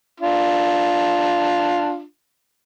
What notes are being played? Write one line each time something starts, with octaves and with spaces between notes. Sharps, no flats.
D4 F4